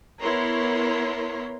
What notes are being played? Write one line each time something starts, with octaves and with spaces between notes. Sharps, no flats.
B3 E4 A#4 C#5 A#5 C6